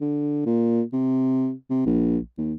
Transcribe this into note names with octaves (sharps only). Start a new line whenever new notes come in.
D3
A#2
C3
C3
A#1
D#2